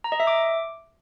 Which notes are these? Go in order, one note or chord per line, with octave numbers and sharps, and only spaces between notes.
A#5
D#5
E5
D6